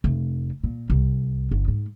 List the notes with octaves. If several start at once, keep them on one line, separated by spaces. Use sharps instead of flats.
F1
A#2
C2
G1
G#2